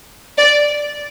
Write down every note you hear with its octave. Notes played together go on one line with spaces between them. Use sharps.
D5